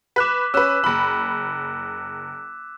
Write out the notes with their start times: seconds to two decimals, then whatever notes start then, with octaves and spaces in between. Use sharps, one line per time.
0.16 B4 D6 F#6 B6 E7
0.54 C#4 B4 E6 F#6 E7
0.84 F#1 B5